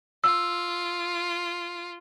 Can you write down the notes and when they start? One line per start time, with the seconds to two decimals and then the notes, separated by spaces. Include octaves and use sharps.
0.24 F4 E6